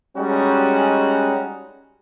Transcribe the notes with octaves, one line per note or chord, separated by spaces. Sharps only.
G3 G#3 C#4 D#4 F#4